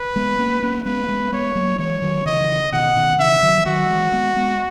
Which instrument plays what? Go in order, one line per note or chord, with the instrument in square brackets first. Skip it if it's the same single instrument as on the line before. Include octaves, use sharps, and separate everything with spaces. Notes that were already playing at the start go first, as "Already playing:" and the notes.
Already playing: [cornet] B4
[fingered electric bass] G#3 B3
A#3 C#4
A#3 C#4
[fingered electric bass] G#3 B3 [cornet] B4
[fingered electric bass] A#3
G#3 B3
[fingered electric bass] G#3 B3 [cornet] C#5
[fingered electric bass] F#3 A#3
[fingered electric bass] E3 G#3 [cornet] C#5
[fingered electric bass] D#3 F#3
[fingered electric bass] C#3 E3 [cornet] D#5
[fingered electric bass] B2 D#3 [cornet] F#5
[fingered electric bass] B2 D#3
[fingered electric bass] C#3 E3 [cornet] E5
[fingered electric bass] D#3 F#3
E3
[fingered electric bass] D#3 F#3 [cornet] F#4
[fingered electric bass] E3 G#3
G#3 B3
G#3 B3